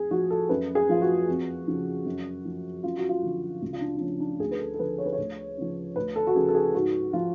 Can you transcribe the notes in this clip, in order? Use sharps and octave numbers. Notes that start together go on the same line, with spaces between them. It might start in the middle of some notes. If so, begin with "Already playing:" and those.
Already playing: F2 G#4
F3 F#4
A4
F#2 B4
G#4
F3 F4
F#4
F2
C#3 F3
F#2
F3
F#2 F4
F#4
F4
D3 F3
C#2 F4
F4
D4
D4
C#3 F3 C#4
D4
D2 G#4
B4
A4
A4
D3 F3 B4
C#5
B4
C#5
D2
C#3 F3
D2 B4
A4
F#4
C#3 F3 G#4
A4
G#4
G#2 F#4
F3 F4